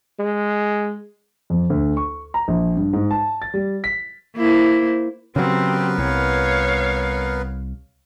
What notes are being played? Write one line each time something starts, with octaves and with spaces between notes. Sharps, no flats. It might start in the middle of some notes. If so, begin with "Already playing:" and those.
G#3
F2
D2
C#6
A#5
A#1
G2
G#2
A5
A6
G3
B6
A#3 E4 C5
C#3 F#3 B3 C4 G4 A#4 B4
C2 C#5 F5